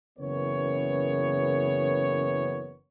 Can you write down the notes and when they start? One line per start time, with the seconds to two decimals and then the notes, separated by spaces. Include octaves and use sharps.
0.19 F#1 C#3 E3 B3 A#4 C#5